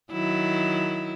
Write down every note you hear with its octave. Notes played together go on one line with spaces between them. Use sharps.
D#3 F#3 E4